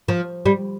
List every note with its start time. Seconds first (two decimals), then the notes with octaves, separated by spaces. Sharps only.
0.08 F3
0.46 G3